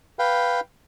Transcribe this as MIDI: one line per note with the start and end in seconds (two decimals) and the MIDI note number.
0.19 0.60 71
0.19 0.60 77
0.19 0.60 79